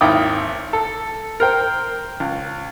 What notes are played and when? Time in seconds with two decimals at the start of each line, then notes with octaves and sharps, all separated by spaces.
0.01 G#1 D#2 E4 G5 D6 D#6
0.73 A4
1.40 A#4 C5 G5
2.20 C#2